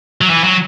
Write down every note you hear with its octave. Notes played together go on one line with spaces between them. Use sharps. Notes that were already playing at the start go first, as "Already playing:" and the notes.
F#3
E3
F#3